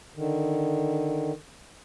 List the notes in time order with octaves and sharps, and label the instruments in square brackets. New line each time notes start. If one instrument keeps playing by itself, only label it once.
[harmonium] D3 D#3